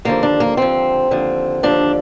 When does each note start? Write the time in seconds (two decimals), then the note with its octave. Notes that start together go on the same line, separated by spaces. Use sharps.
0.05 D#2 D3 F3 A#3
0.23 D4
0.40 A#3
0.57 D#2 D3 F3 C4
1.11 D#2 D3 F3
1.63 D#2 D3 F3 D4